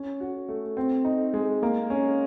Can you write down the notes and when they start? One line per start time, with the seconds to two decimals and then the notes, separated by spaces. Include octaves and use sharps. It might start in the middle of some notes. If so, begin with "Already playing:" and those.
Already playing: C#4
0.20 F#4
0.49 A3
0.77 C4
1.05 D#4
1.33 G#3
1.63 A#3
1.90 C#4